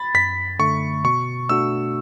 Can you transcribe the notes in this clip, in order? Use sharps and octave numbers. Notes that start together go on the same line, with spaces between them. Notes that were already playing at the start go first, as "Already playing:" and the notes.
Already playing: B5 A6
F#2 B6
D3 A3 C#6
B2 C#6
A3 D4 F#4 E6